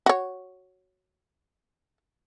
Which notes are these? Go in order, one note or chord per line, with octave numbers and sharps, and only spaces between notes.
F#4 C#5